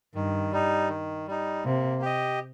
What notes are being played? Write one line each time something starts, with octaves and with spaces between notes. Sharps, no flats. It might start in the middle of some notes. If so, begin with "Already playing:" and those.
G2 D#3
G3 D#4
D#3
G3 D#4
C3 A#3
G4 D#5